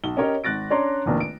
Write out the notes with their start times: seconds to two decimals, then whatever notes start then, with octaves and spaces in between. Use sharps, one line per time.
0.04 B1 G7
0.17 C#4 G4 A#4 C#5 D#5
0.44 G#1 F#6 A6 A#6 D7
0.70 C#4 D4 C#5 D5 A#5 C6
1.06 F1 A#1 D#3 A#3
1.20 D7